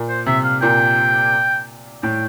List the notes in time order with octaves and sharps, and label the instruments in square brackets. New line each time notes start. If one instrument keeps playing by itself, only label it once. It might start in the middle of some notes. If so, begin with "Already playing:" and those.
Already playing: [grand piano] A#2
[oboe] C5
[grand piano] C3 [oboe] E5
[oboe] F5
[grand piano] A#2 [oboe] G5
[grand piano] A2 [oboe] G5